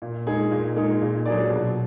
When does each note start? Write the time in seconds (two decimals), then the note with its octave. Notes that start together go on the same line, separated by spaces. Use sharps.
0.02 A#2
0.27 G#3 D#4 G#4
0.51 A#2
0.76 G#3 D#4 G#4
1.02 A#2
1.26 F#3 D4 G#4 D5
1.50 B2